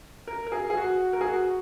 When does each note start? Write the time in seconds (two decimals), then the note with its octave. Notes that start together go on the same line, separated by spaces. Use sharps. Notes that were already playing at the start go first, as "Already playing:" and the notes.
0.28 A#4
0.47 A#4
0.52 G#4
0.70 G#4
0.77 F#4
1.13 A#4
1.21 G#4
1.27 F#4